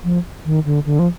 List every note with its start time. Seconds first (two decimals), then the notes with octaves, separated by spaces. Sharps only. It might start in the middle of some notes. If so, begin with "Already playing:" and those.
0.04 F3
0.45 D#3
0.65 D3
0.86 D3
0.99 F3